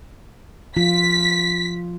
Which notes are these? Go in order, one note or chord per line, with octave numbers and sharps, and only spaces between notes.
F3 F4 B6